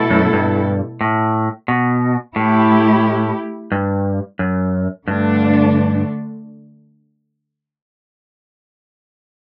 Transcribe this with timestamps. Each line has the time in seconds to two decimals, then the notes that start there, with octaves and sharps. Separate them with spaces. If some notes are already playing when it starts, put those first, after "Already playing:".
Already playing: B2 A3 E4 A4
0.10 F#2
0.33 G2
1.01 A2
1.68 B2
2.36 A2 A3 E4 G4
3.72 G2
4.39 F#2
5.08 G2 D3 A3 D4